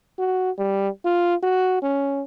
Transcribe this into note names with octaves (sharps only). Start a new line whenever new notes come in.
F#4
G3
F4
F#4
C#4